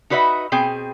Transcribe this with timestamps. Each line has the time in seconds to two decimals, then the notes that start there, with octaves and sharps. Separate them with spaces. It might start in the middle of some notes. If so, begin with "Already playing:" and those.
0.10 D#4 F#4 B4 C#5 D#5 E5
0.52 B2 C4 G#4 G5